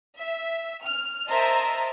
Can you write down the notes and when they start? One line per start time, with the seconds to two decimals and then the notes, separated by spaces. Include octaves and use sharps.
0.17 E5
0.84 F6
1.28 A#4 C5 D#5 E5 A5 A#5